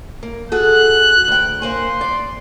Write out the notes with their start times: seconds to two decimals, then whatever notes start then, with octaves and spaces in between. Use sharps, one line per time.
0.23 A#3
0.52 F#4 G#4 A4 F#6
1.28 D2 G5
1.62 A#3 C5 G#5 C6
2.01 D5